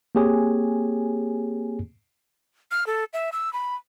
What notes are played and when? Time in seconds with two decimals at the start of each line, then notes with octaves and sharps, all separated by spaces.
0.15 A#3 C4 G4 G#4 C#5 G#5
2.71 F6
2.87 A4
3.13 E5
3.33 E6
3.53 B5